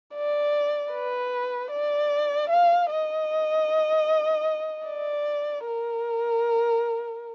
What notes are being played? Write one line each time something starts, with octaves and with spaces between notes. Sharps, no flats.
D5
B4
D5
F5
D#5
D5
A#4